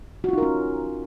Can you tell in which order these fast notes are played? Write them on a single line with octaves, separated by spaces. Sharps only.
F#4 F4 D#4 A#4 C#4